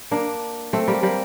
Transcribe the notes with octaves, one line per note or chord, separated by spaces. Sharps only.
A#3 D4
A3 C4
G3 A#3
G3 A#3